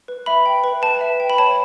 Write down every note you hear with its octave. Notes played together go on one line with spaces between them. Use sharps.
B4
E5 B5
G5
B4
B4 A5
E5
G5
B5
C#5 A5